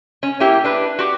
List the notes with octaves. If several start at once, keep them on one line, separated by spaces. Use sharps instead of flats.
C#4
A#3 E4 G4
D4 B4
F#4 G4